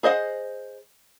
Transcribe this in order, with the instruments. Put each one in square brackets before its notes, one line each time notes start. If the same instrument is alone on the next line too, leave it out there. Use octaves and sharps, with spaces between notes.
[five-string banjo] G#4 C5 D#5 E5 F#5